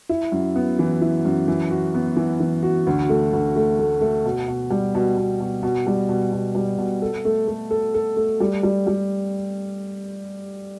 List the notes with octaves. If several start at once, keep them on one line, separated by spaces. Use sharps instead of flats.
E4
F#2
B3
E3
E4
F#2
E3
F#4
B3
E3
E3
F#4
D2
A3
D2
A3
A3
A3
B2
B2
G3
B2
B2
B2
B2
G3
B2
B2
G3
B2
A4
A3
A3
A4
A4
A3
G3
G3
G3